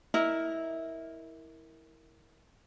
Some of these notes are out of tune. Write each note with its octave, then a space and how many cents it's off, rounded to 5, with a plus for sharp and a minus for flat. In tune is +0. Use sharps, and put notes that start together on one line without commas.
E4 -15 A#4 +0 D#5 +0